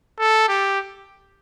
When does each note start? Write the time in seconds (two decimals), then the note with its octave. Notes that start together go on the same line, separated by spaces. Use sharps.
0.19 A4
0.48 G4